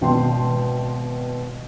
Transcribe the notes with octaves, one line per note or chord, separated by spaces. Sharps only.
G#1 B2 G5 A5 C6